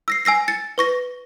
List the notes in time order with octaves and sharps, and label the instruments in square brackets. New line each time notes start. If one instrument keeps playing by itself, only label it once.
[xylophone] E6 A#6 C7
G#5 E6 A#6 C7
A6 C#7
B4 C#6 A#6